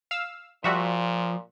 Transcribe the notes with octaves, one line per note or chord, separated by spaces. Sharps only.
F5 E6
A#2 F3 G3 F#4 E5